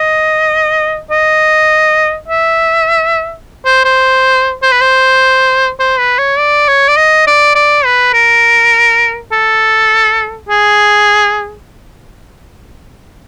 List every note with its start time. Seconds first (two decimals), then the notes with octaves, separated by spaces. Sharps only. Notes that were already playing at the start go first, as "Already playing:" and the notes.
Already playing: D#5
1.11 D#5
2.28 E5
3.65 C5
3.85 C5
4.62 C5
4.72 B4
4.81 C5
5.80 C5
5.99 B4
6.18 C#5
6.38 D5
6.68 C#5
6.88 D5
6.97 D#5
7.27 D5
7.55 D5
7.85 B4
8.14 A#4
9.32 A4
10.49 G#4